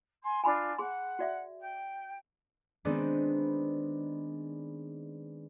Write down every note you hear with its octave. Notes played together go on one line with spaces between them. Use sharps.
G#5 C6
D4 F4 G#5 B5 C6
G#4 F#5 C6
F#4 D5 E5
G5
D#3 G#3 B3 C4 D4 D#4